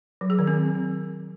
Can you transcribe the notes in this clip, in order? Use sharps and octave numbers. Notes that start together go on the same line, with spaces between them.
F#3
G#4
D#3
C4